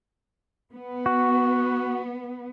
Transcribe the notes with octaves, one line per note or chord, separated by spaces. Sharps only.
B3
F#4